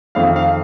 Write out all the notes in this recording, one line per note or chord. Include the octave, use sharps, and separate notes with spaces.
F2 D#3 A3 F5
F5